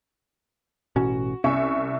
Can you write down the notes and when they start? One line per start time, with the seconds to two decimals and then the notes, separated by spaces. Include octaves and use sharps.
0.96 A1 B2 C#4 F#4
1.44 C2 C#4 E5 C#6